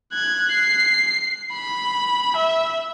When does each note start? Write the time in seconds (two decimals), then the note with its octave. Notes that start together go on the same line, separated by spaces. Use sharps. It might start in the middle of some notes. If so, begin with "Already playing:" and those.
0.13 F#6 G#6
0.51 C7
1.53 B5
2.36 E5